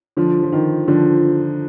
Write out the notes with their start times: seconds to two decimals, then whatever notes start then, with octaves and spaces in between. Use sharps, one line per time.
0.17 D3 F3
0.43 F3
0.52 D#3
0.88 D3 F3